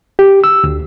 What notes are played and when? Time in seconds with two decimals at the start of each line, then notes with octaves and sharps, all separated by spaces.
0.19 G4
0.44 E6
0.64 D2